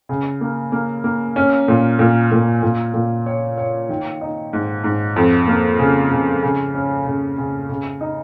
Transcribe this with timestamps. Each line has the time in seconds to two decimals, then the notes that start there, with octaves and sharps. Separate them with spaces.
0.09 C#3
0.41 A#3
0.72 A#3
1.04 A#3
1.36 C#4
1.68 A#2
1.99 A#2
2.31 A#2
2.63 A#2
2.94 A#2
3.26 C#5
3.58 C#5
3.89 D#3
4.21 D#4
4.53 G#2
4.84 G#2
5.16 F2
5.48 A#3
5.79 C#3
6.12 C#3
6.43 C#3
6.74 C#4
7.07 C#3
7.38 C#3
7.69 C#3
8.01 D#4